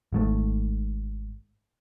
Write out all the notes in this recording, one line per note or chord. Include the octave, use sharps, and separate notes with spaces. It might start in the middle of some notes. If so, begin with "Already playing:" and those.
G#1 G#2 A3